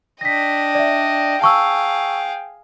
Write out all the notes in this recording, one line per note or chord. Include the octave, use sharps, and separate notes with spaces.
D4 D#5 G5 A#6 B6
D5 E5
G#4 F5 A5 C#6 E6